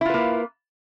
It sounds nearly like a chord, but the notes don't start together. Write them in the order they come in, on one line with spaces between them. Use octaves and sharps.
E4 F4 B4 A#3